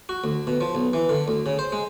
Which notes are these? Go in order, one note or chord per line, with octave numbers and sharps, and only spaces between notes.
F#4
D2
B2
F3
B1
E3
D3
D2
C#3
C5
G#3